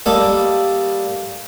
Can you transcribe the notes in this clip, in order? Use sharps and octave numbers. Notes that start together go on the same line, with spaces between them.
G3 A#3 A4 D#5